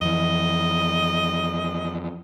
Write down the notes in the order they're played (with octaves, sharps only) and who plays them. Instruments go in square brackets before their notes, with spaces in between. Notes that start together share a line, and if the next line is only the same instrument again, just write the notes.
[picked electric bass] F2 E3 [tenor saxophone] D#5